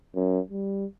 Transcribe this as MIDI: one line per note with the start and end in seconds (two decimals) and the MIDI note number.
0.15 0.40 42
0.51 0.85 55